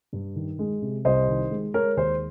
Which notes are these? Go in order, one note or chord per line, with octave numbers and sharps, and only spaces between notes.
G2
D#3
G#3
C3
C2 C5 D#5
D#3
G#3
G#3 A#4 C#5
D#2 C5